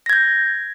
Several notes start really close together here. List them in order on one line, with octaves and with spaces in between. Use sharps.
A#6 G#6 G6